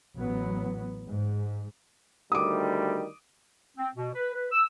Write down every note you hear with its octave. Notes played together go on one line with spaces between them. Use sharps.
A1 F#3 B3
G#2
D2 D#3 G3 D6 D#6
C4
B2
B4
B4
E6